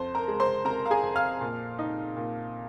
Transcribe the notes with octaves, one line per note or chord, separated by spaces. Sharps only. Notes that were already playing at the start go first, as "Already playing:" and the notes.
Already playing: F2 C5 C6
A#4 A#5
G#3
C5 C6
C3 A#4 A#5
F5
G#4 G#5
F2
F5 F6
A#2
D#4
A#2